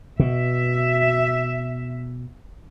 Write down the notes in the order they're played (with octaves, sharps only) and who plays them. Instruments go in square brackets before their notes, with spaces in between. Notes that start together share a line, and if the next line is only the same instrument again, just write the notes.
[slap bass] B2 [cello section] E5